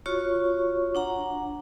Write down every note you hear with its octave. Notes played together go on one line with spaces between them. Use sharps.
F4 F#4 C#5 C#6
D4 F#5 A#5